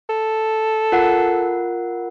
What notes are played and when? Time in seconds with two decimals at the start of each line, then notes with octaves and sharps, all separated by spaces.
0.10 A4
0.92 F4 A#4 F#5